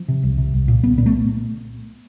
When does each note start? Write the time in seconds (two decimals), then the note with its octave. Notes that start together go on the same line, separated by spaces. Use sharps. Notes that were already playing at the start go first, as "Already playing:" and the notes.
Already playing: F3
0.08 C3
0.23 C2
0.38 C3
0.54 C2
0.68 A#2
0.83 C2 B3
0.98 A#2 B3
1.06 A3